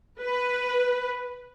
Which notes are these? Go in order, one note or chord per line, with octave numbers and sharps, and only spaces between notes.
B4